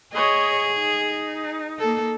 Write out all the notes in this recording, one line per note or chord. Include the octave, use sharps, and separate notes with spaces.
G#4 C#5 D#5
D#4
A#3 A4